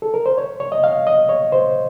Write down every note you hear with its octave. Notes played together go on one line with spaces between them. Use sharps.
A4
A#4
C5
C#5
C#5
D#5
F5
D#5
C#5
C5